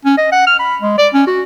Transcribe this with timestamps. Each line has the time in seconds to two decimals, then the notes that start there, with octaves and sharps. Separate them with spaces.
0.05 C#4
0.18 D#5
0.32 F#5
0.47 F6
0.59 B5
0.81 G#3
0.98 D5
1.13 C#4
1.27 F#4